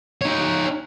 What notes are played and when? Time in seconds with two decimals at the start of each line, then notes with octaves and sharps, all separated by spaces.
0.21 D#4 C#5